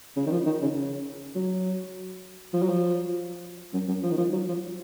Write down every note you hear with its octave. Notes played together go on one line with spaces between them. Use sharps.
C#3
D#3
F3
D#3
C#3
C#3
F#3
F3
F#3
F3
F#2
F#2
F3
D#3
F3
F#3
F3